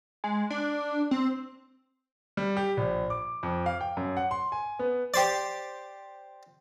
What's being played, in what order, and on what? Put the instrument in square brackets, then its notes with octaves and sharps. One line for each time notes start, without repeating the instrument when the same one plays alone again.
[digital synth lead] G#3
D4
C4
[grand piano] G3
G4
A#1
D6
F2
F5
G5
F#2
F#5
C6
G#5
B3
[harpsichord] G4 C5 D5